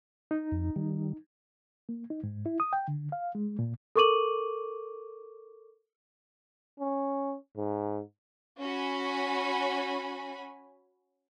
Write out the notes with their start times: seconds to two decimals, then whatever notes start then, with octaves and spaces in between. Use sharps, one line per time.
0.31 D#4
0.52 F2
0.76 D#3 G3
1.89 A#3
2.10 D#4
2.23 G#2
2.46 E4
2.60 D#6
2.73 G5
2.88 D3
3.12 F5
3.35 G#3
3.59 A#2
3.96 A4 A#4 C#6 D6 D#7 F#7
6.80 C#4
7.57 G#2
8.60 C#4 F#4 G#5 B5